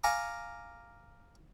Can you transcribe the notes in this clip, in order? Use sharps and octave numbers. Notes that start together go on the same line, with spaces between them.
F5 G#5 A#5 C#6 D6